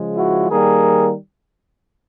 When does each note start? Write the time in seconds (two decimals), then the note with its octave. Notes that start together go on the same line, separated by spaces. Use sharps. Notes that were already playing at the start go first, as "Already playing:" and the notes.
Already playing: C#3 F3 G#3
0.16 E4 F#4
0.49 D#3 G3 A#3 G#4 A#4